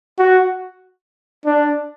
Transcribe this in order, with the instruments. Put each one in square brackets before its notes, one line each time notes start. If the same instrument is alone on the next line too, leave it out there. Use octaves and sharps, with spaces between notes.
[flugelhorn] F#4
D4